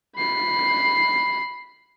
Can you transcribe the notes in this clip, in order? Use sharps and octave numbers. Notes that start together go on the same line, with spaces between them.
B5 C7